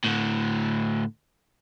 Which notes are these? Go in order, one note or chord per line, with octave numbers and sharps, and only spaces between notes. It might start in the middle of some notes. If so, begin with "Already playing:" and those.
A2 D3